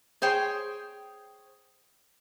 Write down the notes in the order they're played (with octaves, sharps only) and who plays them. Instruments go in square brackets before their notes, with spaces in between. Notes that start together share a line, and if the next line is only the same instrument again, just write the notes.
[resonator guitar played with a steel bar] G#4 C5 C#5 G5